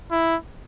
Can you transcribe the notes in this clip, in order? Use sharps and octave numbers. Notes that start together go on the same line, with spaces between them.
E4